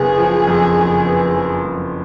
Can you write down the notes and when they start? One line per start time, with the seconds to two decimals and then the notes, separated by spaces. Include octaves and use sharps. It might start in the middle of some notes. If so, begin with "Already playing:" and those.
Already playing: F#1 B3 G#4
0.18 F3
0.47 F2
0.76 F#1
1.05 B3
1.34 F3
1.64 F2